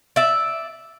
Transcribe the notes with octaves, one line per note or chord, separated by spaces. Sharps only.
D5 E5